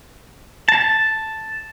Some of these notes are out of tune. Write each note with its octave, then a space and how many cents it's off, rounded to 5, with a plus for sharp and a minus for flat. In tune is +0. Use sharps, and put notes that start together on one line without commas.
A5 +0